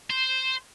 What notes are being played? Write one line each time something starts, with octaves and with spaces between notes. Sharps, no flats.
C5